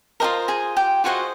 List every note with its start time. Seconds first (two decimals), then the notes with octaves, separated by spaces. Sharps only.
0.20 F4 G#4 A#4 C5 D#5 A#5
0.48 G#4 G#5
0.77 G4 G5
1.04 F4 F#4 G#4 C5 D#5 F#5